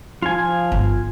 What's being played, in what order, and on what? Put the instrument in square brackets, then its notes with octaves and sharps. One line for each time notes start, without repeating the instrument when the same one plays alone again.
[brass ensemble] F3 [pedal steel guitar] F4 G#5
[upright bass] G1